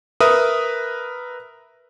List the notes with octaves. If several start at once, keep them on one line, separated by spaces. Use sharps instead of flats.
A#4 B4 E5 D#6